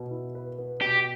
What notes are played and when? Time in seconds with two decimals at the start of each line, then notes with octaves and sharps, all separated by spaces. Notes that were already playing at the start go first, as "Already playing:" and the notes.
Already playing: B2 B3
0.11 E4
0.35 B4
0.58 B3
0.81 B2 G4